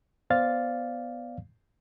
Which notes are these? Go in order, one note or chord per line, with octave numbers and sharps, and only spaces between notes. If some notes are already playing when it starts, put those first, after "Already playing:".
B3 C5 D5 F5 A6